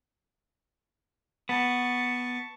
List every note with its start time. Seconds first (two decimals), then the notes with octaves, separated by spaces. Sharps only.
1.49 B3 A5 C#6